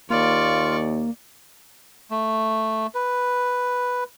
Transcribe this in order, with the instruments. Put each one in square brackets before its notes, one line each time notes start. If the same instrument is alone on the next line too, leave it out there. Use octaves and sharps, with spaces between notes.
[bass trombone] D#2 [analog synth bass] A#3 [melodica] F4 [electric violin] D5 C#6
[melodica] A3
B4